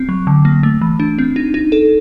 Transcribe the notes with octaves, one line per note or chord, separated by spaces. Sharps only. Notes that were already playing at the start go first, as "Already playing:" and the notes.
Already playing: C4
F#3
D3
A#3
A3
E3
D4
C4
D#4
D#4
A4